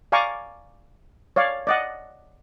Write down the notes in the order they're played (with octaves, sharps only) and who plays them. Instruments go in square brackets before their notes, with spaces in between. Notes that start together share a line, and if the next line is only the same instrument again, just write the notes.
[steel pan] D5 F5 G#5 A#5 C#6 D6
C#5 D5 F5
D5 D#5 F#5